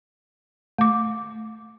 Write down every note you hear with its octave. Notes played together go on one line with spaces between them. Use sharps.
A3 D6